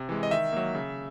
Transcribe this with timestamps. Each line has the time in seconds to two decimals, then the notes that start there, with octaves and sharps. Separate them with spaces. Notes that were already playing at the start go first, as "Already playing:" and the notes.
Already playing: C3
0.09 E3 G#3
0.23 D#5
0.31 D#3 E5
0.53 F#3 A#3
0.75 C#3